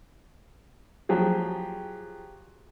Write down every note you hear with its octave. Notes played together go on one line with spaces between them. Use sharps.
F3 F#3 G4 G#4